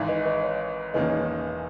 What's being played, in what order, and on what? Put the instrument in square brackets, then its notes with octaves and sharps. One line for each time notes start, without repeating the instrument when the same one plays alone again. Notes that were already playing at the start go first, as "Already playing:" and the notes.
Already playing: [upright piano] G#1 G#2 E3
[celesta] B4 D#5
B4 D#5
C#5
[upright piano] E1 E2 D#3 A#3 C#4 [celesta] B4 D#5